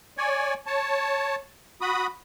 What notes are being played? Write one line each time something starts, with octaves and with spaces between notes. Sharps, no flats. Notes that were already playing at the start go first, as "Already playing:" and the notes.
C#5 D5 G#5
C#5 A5
F#4 B5 D#6